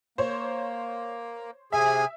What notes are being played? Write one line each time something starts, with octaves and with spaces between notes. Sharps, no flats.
A#3 C5 C#5
C3 G#4 E5 G#5